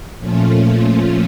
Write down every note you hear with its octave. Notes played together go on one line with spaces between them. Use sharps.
A#2 F3 A3 C#4 F4